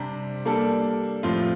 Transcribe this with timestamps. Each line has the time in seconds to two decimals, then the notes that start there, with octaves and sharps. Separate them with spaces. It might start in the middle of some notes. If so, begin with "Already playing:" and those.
Already playing: C3 G3 D4 G4 C5
0.45 G3 A#3 D4 A4
1.23 A2 F3 C4 F4